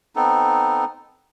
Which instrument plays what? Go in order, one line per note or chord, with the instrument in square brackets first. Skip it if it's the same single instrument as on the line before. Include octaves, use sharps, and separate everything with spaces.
[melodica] B3 C4 D#4 A4